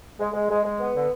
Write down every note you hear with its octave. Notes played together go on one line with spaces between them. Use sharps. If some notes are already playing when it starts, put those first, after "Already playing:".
G#3
G#3
G#3
G#3
B3
D3